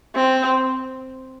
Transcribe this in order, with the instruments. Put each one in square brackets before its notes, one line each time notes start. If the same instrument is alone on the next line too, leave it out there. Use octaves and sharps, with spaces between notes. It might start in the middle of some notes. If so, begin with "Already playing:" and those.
[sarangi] C4